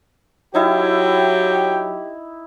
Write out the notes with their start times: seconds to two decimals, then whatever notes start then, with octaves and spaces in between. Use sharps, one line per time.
0.55 F#3 D#4 E4 G4 G5